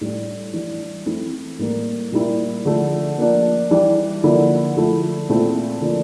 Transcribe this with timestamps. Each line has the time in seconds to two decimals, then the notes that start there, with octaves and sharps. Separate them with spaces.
0.01 A2 G3 D4
0.54 E3 G3 D4
1.06 E3 A3 C4 E4
1.59 A2 G3 A#3
2.12 A#2 G3 A#3 E4
2.65 D3 F3 A3 D4
3.18 F3 A#3 D4
3.70 E3 G3 D4
4.23 D3 F3 A#3 E4
4.77 D3 F3 A3 E4
5.29 A#2 A3 C4 E4
5.81 D3 F3 A#3 D4